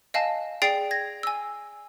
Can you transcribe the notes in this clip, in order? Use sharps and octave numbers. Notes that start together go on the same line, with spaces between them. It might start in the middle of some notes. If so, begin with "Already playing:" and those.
D#5 F5 G#5 A5
G#4 D5 G5 A6 C7 D7
G#6 A#6
G#5 E6